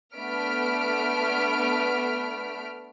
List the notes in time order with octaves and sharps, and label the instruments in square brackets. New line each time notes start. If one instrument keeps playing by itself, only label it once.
[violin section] A3 B3 D4 F6 B6 D7